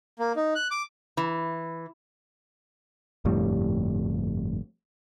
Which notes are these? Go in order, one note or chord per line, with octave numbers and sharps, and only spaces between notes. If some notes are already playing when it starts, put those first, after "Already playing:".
A#3
D#4
F#6
D6
E3
G1 F2 A2 G3